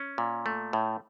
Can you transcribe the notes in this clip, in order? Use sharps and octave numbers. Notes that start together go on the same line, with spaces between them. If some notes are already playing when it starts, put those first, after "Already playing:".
Already playing: C#4
A#2
A3
A2